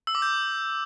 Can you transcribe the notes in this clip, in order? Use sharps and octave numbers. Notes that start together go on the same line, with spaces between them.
E6
D6
G6